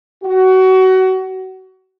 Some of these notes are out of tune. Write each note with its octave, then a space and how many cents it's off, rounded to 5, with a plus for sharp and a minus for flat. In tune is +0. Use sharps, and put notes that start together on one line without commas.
F#4 +25